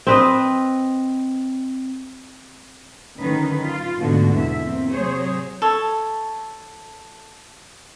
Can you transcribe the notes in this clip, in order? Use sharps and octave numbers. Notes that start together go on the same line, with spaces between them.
C4 B4 D#5
D3 D#3 F#3 C#4 D#4 B4
F4
D2 G#2 B2 D3 G#3 F#4
E2 G#2 B2 E5
E3 A#3 C4
C3 F#3 G#4 C5 C#5
A4 C#5